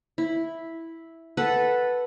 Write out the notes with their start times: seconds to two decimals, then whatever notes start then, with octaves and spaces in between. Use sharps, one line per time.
0.18 E4
1.37 A4 B4 F#5